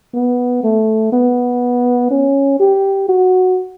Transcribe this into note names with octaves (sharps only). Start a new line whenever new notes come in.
B3
A3
B3
C#4
G4
F#4